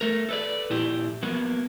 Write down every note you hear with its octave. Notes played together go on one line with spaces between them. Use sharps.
A3 A#4
A4 B4 D5
A#2 E4 G4
F#3 A#3 B3